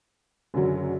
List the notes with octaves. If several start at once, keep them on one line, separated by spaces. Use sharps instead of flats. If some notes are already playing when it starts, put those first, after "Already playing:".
F#1 F#2 D3 F#3